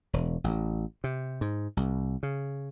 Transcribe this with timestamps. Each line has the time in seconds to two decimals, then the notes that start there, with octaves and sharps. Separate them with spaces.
0.13 E1
0.44 A1
1.04 C3
1.41 G#2
1.77 C2
2.23 C#3